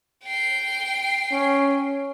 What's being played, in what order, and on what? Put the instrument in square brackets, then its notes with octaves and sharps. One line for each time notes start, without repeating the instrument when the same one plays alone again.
[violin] G5 C7
[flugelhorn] C#4